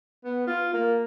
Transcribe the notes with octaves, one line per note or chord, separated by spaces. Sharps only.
B3
F4
A#3